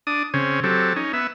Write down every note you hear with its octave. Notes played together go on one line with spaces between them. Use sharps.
D4 D#6
C#3 C4 C#4
F#3 C4 G4 A4
C#4 D#4
B3 E5